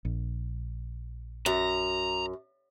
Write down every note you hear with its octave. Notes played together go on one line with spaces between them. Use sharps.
A#1
F#2 A#5